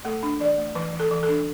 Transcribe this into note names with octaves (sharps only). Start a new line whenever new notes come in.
A3 A4
D4
E3 D5
A3
E3 B4
E3
A4
E3
A4
D4